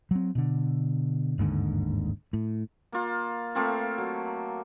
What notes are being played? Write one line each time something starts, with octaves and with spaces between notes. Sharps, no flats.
F#3 C4
B2 D3
G1 D#2 G#2 D3
A2
A#3 F4
A3 A#3 C4 F4
F#3